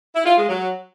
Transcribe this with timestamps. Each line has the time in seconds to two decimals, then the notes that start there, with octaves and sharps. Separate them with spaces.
0.15 E4
0.26 F4
0.37 G#3
0.48 F#3